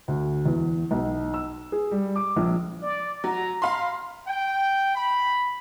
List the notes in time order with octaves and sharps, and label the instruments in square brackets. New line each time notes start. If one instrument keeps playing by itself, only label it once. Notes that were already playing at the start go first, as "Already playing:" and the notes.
[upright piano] D2
E2
B1
E6
G#4
G3
D6
A#1
[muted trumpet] D5
[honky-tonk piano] F#3 [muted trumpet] A#5
[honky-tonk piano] F5 B5 C6
[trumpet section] G5
B5